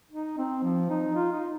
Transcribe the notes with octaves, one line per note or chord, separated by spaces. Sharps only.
D#4
C4
F3
D#4
F4
D#4